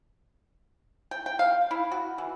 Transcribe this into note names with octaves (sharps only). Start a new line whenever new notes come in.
G5
G5
F5
E4
F#4
E3